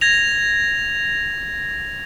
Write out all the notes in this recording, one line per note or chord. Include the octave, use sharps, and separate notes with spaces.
G#6 A#6 F7